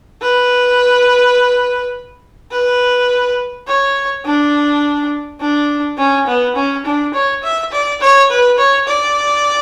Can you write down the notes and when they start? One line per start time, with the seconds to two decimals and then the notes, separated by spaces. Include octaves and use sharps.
0.22 B4
2.51 B4
3.67 C#5
4.25 D4
5.41 D4
5.98 C#4
6.27 B3
6.56 C#4
6.86 D4
7.14 C#5
7.43 E5
7.72 D5
8.01 C#5
8.30 B4
8.58 C#5
8.87 D5